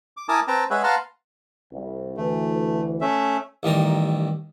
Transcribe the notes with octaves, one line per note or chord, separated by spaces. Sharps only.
D6
E4 A#4 G#5 A5 D6 D#6
C4 B4 G5 A5 A#5
G#3 G#4 B4 C#5 E5 F#5
B4 F5 F#5 A5 A#5 C6
C2
D2 E3 A3
A3 C#4 E5
A1 D#3 G3 A#5